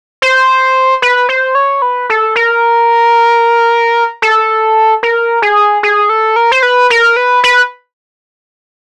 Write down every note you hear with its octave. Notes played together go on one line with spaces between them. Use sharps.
C5
B4
C5
C#5
B4
A4
A#4
A4
A#4
G#4
G#4
A4
A#4
C5
B4
A#4
B4
B4